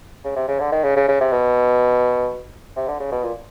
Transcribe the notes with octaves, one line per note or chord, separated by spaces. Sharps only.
C#3
C3
C#3
D3
D#3
C#3
C#3
C#3
C3
B2
C3
D3
C#3
B2
A#2